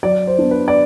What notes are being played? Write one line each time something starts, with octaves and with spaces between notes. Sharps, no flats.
F#3 D5
C5
B3 D4
B4
D5